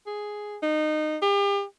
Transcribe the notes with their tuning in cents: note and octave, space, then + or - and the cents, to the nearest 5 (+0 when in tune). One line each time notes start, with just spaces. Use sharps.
G#4 +5
D#4 -20
G4 +40